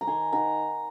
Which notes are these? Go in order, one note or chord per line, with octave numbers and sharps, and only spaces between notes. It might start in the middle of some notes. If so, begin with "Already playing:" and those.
A#5
D#3 G#5 C6
D#3 F#5 A#5